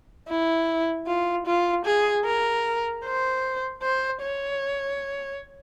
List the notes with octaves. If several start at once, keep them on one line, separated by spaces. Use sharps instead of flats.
E4
F4
F4
G#4
A#4
C5
C5
C#5